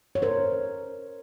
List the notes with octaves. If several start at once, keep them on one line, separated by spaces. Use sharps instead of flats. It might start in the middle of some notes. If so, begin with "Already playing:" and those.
C#5
A#4 C5